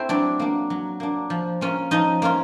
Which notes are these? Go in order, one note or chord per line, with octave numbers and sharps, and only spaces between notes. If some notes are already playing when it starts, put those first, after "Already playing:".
Already playing: A3 C4 E4 C5
F#3 D4 D5
A#3 D4
F#3
A#3 D4
F3
A#3 C#4 F4
F3 D#4 D#5
A#3 C#4 F4